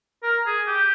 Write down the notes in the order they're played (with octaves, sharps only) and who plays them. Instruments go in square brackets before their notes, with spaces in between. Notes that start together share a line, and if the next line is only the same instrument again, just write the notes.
[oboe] A#4
G#4
G4